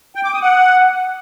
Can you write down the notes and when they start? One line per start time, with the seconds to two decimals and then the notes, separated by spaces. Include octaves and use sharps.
0.15 G5
0.24 D6
0.33 D#6
0.42 F#5